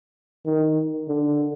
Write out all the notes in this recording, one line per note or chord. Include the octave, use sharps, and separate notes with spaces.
D#3
D3